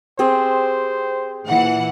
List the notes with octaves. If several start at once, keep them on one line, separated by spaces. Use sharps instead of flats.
C4 G4 G#4 C5
A#2 E3 F#5